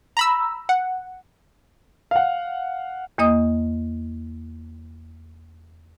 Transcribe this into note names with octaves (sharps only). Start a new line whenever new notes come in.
A#5 B5 E6
F#5
F5 F#5
E2 A#3 D#5 D#6